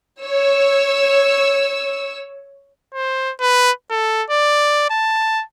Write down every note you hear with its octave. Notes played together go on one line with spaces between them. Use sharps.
C#5 E6
C5
B4
A4
D5
A5